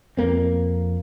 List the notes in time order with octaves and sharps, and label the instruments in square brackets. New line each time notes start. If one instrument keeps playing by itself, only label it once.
[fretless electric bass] F2 A#3 C4